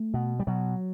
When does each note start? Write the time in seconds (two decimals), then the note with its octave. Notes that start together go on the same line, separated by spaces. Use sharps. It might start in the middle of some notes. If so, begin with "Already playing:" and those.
Already playing: A3
0.14 B2
0.40 G3
0.47 B2 F#3